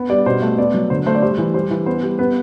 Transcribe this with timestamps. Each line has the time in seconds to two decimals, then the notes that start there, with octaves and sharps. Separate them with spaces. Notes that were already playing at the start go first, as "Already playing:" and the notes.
Already playing: B3
0.09 G3 D5
0.26 B2 C5
0.42 A3
0.57 B3 D5
0.74 F#3
0.90 D3 C5
1.06 A3 C5
1.15 D5
1.22 G3 C5
1.38 E3
1.54 G3 C5
1.71 E3
1.86 B3 C5
2.03 G3
2.19 B3 B4